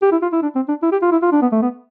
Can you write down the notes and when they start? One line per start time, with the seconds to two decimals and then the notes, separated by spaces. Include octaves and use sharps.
0.02 G4
0.12 E4
0.22 F4
0.32 E4
0.42 D4
0.55 C4
0.68 D4
0.82 E4
0.92 G4
1.02 F4
1.12 E4
1.22 F4
1.32 D4
1.42 B3
1.52 A3
1.62 B3